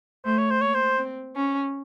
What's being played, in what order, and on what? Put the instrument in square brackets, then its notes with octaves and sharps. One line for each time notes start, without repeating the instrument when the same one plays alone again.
[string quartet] A3 [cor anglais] C5
[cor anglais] C#5
C5
[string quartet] A#3 [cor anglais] C#5
[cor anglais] C5
[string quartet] C4
C#4